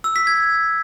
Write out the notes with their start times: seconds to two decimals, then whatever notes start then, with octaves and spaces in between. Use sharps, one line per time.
0.04 E6
0.16 B6
0.27 G#6